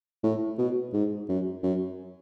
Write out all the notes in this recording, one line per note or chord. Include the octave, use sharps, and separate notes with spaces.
A2
B2
G#2
F#2
F#2